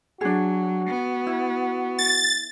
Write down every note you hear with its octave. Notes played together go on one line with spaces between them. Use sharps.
F#3 D4 F#4 G#4
B3
E4
A6